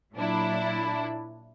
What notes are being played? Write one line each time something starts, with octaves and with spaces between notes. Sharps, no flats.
A#2 F#3 D4 E4